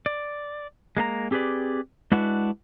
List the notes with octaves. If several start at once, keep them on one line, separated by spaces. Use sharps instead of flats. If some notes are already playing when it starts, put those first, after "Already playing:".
D5
G#3 A#3 D4 A#5
C4 G4 G#4 B4 D5
G#3 D4 E4 F#4 B4 F#5